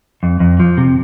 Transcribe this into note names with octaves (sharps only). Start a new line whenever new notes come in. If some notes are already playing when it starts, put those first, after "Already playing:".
F2
F2
F3
C3